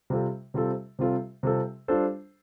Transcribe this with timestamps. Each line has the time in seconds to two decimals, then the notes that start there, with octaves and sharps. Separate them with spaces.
0.10 C3 G3 C4 F4 A4
0.54 C3 G3 C4 F4 A4
0.99 C3 G3 C4 F4 A4
1.43 C3 G3 C4 F4 A4
1.88 G3 D4 F4 A4 C5